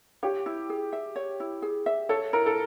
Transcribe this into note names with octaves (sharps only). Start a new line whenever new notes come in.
G4 C#5
E4
G#4
E5
C#5
E4
G#4
E5
A4 C#5
E4 A#4
A4